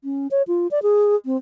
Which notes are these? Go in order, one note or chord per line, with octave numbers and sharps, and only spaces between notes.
C#4
C#5
F4
D5
G#4
C4